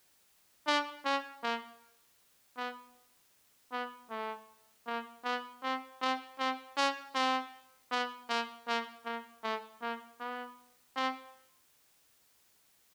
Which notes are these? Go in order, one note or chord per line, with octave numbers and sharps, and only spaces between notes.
D4
C#4
A#3
B3
B3
A3
A#3
B3
C4
C4
C4
C#4
C4
B3
A#3
A#3
A#3
A3
A#3
B3
C4